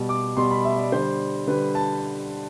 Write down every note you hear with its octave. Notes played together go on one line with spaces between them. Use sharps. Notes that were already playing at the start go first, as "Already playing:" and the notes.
Already playing: B2 G3
D6
B2 G3 C6
B5
E5
D5
D3 G3 C5
D3 G3 B4
A5